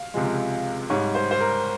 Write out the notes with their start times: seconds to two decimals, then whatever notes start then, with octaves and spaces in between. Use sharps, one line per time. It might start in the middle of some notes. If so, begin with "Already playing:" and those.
Already playing: F5
0.14 C#2 C3 F3 G#3
0.90 G#2 G3 C#5
1.15 C5
1.31 C5
1.40 A#4